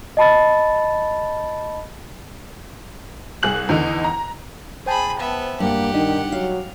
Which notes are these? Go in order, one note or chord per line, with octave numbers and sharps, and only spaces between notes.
D#5 A5 B5 A6
C2 G#4 F#6 F#7
E2 D3 D#3 D#4
A#5
G#4 C5 G5 A5 B5
B3 E5
G2 A#3 G4 F#5
D#3 D4 D#4
F#3 F5